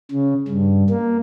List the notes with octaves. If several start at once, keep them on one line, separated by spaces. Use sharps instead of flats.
C#3
G2
A#3